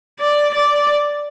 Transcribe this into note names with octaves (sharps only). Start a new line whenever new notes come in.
D5
D5